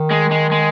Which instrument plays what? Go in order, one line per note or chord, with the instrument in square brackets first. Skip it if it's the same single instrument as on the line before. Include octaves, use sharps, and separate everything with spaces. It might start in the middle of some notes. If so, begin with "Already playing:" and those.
Already playing: [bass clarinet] D#3
[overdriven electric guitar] G#3
G#3
G#3